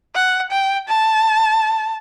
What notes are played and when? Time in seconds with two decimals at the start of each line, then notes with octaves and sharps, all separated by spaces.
0.15 F#5
0.51 G5
0.89 A5